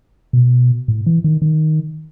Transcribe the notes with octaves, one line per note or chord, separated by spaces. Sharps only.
B2
A2
E3
D#3
D#3